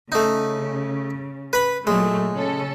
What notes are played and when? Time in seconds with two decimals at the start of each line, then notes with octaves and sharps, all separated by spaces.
0.12 C#3 A3 D#4
1.53 B4 B5
1.87 A#2 F#3 G#3 A3
2.34 C#3 C#4 A4